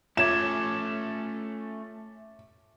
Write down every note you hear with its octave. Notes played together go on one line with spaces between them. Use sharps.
A3 C#4 F4 C#5 E5 D6 G#6 E7